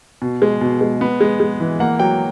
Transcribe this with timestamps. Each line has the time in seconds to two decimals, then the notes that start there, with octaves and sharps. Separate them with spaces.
0.22 B2
0.42 G#3
0.61 B2
0.81 G#3
1.01 B3
1.21 G#3
1.40 G#3
1.60 E3
1.80 A#3 F#5
1.99 F#3 G5